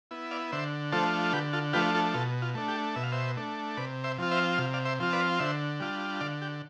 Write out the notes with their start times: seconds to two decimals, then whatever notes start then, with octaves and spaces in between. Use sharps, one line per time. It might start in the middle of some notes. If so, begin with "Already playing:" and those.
0.11 B3 E4
0.31 D5 F5
0.52 D3 C5 E5
0.92 F3 A3 D4 F4 A4 C5
1.33 D3 G4 B4
1.53 F4 A4
1.73 F3 A3 D4 F4 G4 B4
1.95 F4 A4
2.14 B2 F4 A4
2.42 F4
2.55 A3 D4
2.68 G4
2.96 B2 E5
3.03 F5
3.12 C5 E5
3.37 A3 D4
3.77 C3 B4 D5
4.04 C5 E5
4.18 F3 C4 F4
4.31 C5 E5
4.58 C3 F5
4.74 D5 F5
4.85 C5 E5
5.00 F3 C4 F4
5.13 B4 D5
5.39 D3 C5 E5
5.80 G3 D4 F4
6.21 D3 D5 F5
6.42 G4